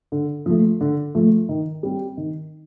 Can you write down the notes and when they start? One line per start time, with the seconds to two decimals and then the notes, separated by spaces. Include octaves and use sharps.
0.12 D3
0.46 F3 A3
0.80 D3
1.15 F3 A3
1.49 D#3
1.83 G3 C4
2.17 D#3